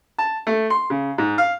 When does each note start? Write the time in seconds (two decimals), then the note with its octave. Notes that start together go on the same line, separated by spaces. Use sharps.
0.18 A5
0.47 A3
0.70 C6
0.90 C#3
1.18 G#2
1.38 F5